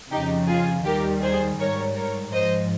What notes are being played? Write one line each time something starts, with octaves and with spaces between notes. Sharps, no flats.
F2 C#3 F3 D#4 G4
F4 G#4
D#2 D#3 G3 G4 A#4
G#4 C5
G#2 G3 A#4 C#5
A#4 C#5
G#2 F3 C5 D#5